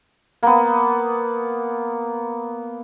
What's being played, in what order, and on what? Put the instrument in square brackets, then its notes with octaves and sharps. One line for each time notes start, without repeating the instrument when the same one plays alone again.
[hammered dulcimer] A#3 B3